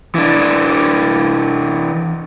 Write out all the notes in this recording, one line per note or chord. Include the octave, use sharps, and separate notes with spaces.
E3 D4